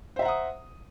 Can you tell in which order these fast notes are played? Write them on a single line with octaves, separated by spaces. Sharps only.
C5 E5 A#5 F#5 D#6